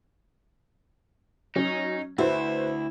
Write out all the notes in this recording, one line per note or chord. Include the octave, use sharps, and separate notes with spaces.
F#3 C#4 D#4
D2 E4 F#4 B4 C5